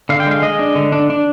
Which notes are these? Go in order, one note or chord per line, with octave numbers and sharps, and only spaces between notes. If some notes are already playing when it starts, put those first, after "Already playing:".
D3 F5
G5
G#3 F5
G#3 D#5
D4
D3
D4
D4